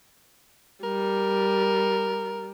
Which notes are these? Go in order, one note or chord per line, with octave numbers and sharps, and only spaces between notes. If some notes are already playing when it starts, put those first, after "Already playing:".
G3 A#4